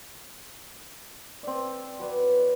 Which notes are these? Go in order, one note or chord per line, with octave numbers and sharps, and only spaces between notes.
C4 D5
F#3 B4 D5